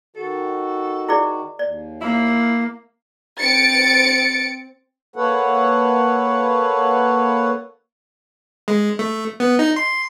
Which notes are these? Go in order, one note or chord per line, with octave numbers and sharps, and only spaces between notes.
D#3 F#4 A4
E4 G#4 D5
D#2 D5
A#3 E4
C4 A6 C#7 D7
A#3 A4 B4 C#5 F#5
G#3
A3
B3
D#4
C6